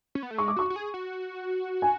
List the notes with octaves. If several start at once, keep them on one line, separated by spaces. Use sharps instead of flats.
C#4
B3
A3
G#3 C#6
D6
F#4 C#6
F#4
G#4
F#4
G#5